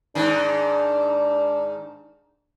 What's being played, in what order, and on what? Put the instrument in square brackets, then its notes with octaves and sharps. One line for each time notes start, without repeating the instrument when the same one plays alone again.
[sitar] G#2 D#3 [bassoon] D4